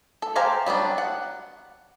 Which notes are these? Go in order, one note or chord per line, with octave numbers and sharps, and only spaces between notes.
A4
G4 C5 F5 G#5 A#5
F#3 G3 B3 D4
F#5